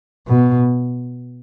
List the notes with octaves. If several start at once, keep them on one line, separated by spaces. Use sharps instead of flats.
B2